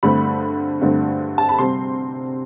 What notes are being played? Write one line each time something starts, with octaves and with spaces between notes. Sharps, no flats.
G2 D3 A3 C4 B5
G2 D3 A3 C4
A5
B5
C3 G3 C4 C6